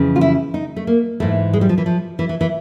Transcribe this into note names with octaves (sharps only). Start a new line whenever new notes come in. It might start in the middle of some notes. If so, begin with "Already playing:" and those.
Already playing: F2 C#3 E3
F4
E4
D#4
A3
A#3
G#2 E3 A3
G#3
G3
F3
E3
F3
E3
E3
E3